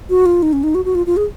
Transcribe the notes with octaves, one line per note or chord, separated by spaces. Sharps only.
F#4
F4
D#4
C#4
D#4
F#4
F#4
F4
F4
G#4